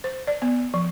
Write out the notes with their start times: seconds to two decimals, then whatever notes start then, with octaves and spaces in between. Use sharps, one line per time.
0.04 C5
0.27 D5
0.42 B3
0.74 F3